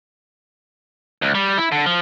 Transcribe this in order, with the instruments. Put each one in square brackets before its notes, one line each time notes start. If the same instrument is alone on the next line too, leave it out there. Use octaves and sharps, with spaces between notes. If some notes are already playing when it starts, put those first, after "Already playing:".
[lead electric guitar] C#2
G3
E4
D3
F3